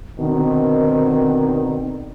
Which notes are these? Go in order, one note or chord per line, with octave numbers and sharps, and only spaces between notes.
B2 D3 D#3 C4